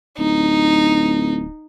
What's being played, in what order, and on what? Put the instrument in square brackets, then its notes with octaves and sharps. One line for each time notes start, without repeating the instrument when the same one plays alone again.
[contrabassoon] D1 [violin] D#4